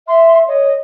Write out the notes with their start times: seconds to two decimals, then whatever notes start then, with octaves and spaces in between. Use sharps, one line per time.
0.08 E5 C6
0.48 C#5 D#5